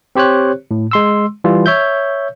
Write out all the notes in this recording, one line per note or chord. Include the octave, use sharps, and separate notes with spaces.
C4 G4 C5 C#5 F#6
A2
G#3 C6 E6
E3 G3 F4
C#5 E5 G6